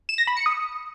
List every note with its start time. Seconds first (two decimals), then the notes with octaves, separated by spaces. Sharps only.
0.09 E7
0.18 A#6
0.27 B5
0.37 C#7
0.46 D#6